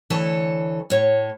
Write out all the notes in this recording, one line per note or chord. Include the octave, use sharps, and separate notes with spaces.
D2 E3 A4 C#5 A5
A2 C#5